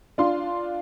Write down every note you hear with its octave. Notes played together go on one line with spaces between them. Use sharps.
D4 F4 C6